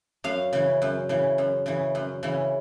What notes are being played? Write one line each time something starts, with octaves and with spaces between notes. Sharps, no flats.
F#2 F5
C#3 E3
F#2
C#3 E3
F#2
C#3 E3
F#2
C#3 E3